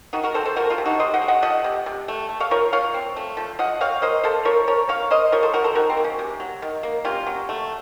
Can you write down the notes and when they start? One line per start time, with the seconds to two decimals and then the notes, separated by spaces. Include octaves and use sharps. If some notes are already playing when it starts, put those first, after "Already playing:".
0.13 D#3 D#4 F#4
0.23 F#4 A#4
0.34 C4 A4 C5
0.45 A4 C5
0.56 F3 F#4 A#4
0.70 F4 A4
0.78 C3
0.85 D#4 F#4
1.00 C3 C5 D#5
1.14 D#5 F#5
1.21 A3
1.28 D#5 F#5
1.42 F3 D#5 F#5
1.64 C3
1.86 C3
2.08 A3
2.29 A3
2.40 C#5 F5
2.51 F3 A#4 C#5
2.73 F3 C#5 F5
2.94 C4
3.16 A3
3.37 F3
3.59 F3 D#5 F#5
3.81 C4 C#5 F5
4.02 A#3 C5 D#5
4.24 A#3 A4 C5
4.45 F3 A#4 C#5
4.67 F3 A#4 C#5
4.89 A#3 C#5 F5
5.11 A#3 C5 D#5
5.32 F3 A#4 C#5
5.43 A4 C5
5.54 F3 F#4 A#4
5.64 A4 C5
5.75 D#3 F#4 A#4
5.90 C4
5.97 A#3
6.04 C#4
6.19 C3
6.40 F#3
6.62 D#3
6.83 A#3
7.05 C3 C#4 F4
7.27 F#3
7.49 A3